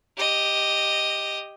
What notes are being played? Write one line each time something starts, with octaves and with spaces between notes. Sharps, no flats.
G4 D#5